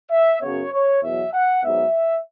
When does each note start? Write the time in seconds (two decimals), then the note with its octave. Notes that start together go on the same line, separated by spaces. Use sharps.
0.11 E5
0.41 F#2 C#3 F#3 B3 C#5
0.73 C#5
1.03 E2 B2 F#3 E5
1.33 F#5
1.63 G#2 F#3 B3 E5